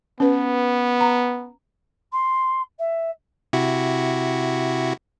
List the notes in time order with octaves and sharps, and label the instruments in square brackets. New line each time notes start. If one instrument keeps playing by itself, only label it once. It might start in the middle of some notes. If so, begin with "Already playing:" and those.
[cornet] B3 [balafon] C#4 B4
[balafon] A#5
[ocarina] C6
E5
[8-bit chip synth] C3 E4 F#4